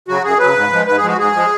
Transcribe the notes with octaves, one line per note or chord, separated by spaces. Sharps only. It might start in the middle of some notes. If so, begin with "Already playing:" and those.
C#3 F#3 F#4
F#2 G#4
F#3 B4
C#3
G#2
F3 G#3
G#2 B4
G#4
F3 G#3 F#4
G#2 G#4
F3 G#3